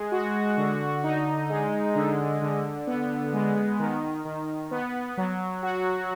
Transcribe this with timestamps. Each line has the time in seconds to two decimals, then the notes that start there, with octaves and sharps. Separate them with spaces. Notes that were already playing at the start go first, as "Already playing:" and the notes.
Already playing: G#3
0.12 F#4
0.57 D3
1.04 D#4
1.50 G#3
1.95 D3
2.42 D3
2.87 B3
3.33 G#3
3.79 D#3
4.25 D#3
4.71 B3
5.17 F#3
5.63 F#4